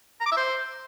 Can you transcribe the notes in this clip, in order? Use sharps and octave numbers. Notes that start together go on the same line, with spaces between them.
A#5
D6
E5
C5